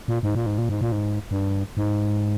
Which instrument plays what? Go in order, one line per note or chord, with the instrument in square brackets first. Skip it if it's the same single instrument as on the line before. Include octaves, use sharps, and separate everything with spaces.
[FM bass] A#2
G#2
A#2
G#2
A#2
G#2
A#2
G#2
G2
G#2